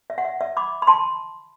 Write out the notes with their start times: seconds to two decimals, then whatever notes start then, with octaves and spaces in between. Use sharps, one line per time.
0.10 E5
0.18 F#5
0.25 E5
0.41 E5
0.57 B5 D6
0.82 B5
0.87 A5 C6